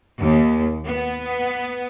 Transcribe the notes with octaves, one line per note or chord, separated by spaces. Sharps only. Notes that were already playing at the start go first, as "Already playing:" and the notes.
D#2
B3